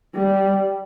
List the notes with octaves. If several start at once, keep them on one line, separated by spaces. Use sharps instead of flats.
G3